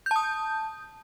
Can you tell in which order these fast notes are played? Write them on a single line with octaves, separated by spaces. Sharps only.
G6 A5 D#6